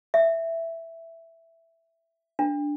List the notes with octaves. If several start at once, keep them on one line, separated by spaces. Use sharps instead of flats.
E5
D4